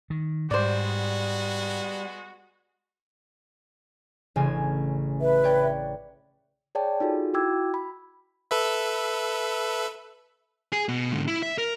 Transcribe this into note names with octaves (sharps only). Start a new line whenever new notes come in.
D#3
G#2 G3 G#3 B3 F#4 C5 D5
A1 C#3 G#5
B4 E5
C#5 D5 G5
G#4 C#5 D5 G5 A5
D#4 F4 F#4 G#4 A4
E4 F#4 G5 D6 E6 G#6
B5
A4 B4 E5
G#4
B2
G#2 D3
E4
E5
A#4